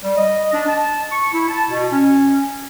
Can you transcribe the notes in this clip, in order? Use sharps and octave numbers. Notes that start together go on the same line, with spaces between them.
G3
D#5
D4
A5
C#6
E4
A5
B2
C#4